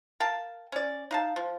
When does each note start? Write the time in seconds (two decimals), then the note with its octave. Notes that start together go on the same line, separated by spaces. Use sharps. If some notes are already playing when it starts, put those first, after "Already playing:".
0.20 A#4 F5 G5 A5
0.72 C#4 D5
1.11 D#4 F5 A5
1.36 F3